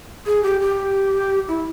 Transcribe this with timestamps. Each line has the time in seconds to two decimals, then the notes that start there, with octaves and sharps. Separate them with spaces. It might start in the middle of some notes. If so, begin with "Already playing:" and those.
0.26 G#4
0.43 G4
0.60 G4
1.48 E4